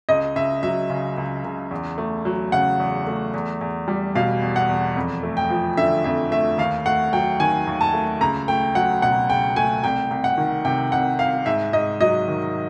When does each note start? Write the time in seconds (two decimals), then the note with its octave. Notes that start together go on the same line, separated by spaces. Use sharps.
0.09 C#2 D#5
0.36 C#2 E5
0.63 F#3 E5
0.90 C#3
1.18 C#2
1.44 C#2
1.71 E2
1.98 A3
2.25 F#3
2.52 C#3 F#5
2.80 E2
3.07 A3
3.34 E2
3.61 E2
3.88 G3
4.15 B2 F5
4.42 E2
4.56 F#5
4.69 E2
4.96 F2
5.23 A3
5.37 G5
5.50 F3
5.77 D3 E5
6.04 F2 E5
6.31 A3 E5
6.58 D#2 F5
6.86 A3 F#5
7.13 F#3 G5
7.40 D#3 G#5
7.67 D#2
7.81 A5
7.93 A3
8.21 C#2 A#5
8.48 A3 G5
8.75 F#3 F#5
9.02 B2 F#5
9.29 C#2 G5
9.56 A3 G#5
9.84 C2 G5
10.11 C2
10.24 F#5
10.38 D#3
10.65 C3 G5
10.92 C2 F#5
11.19 C2 F5
11.46 G#2 E5
11.73 G#2 D#5
12.01 F#3 D#5
12.28 D#3